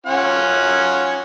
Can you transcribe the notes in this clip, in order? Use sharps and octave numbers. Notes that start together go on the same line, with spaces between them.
C#4 F4 F#5